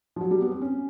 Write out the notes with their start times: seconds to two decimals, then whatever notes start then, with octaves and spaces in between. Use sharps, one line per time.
0.16 F3
0.21 F#3
0.31 G3
0.42 B3
0.51 C4
0.62 C#4